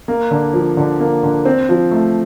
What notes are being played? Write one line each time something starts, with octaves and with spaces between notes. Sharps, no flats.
A#3
D3
F3
D3
A#3
D3
C4
F3
A3